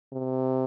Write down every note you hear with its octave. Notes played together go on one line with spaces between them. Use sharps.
C3